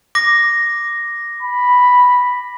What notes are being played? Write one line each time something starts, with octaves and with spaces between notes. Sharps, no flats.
D6 A#6
B5